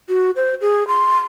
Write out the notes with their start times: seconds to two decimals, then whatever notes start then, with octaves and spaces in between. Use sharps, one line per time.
0.09 F#4
0.36 C5
0.61 G#4
0.88 C6